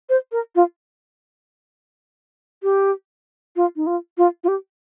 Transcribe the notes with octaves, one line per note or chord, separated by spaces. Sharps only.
C5
A#4
F4
G4
F4
D#4
F4
F4
F4
G4